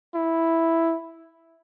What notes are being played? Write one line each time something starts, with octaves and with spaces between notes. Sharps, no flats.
E4